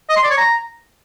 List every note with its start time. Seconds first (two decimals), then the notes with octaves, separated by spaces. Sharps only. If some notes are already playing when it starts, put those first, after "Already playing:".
0.09 D#5
0.16 C6
0.23 D5
0.30 C#5
0.37 A#5